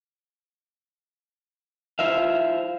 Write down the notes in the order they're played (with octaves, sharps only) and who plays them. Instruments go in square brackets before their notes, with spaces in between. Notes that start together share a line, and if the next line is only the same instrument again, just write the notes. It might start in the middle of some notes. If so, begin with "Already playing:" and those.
[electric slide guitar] E4 F4 C5 E5 F5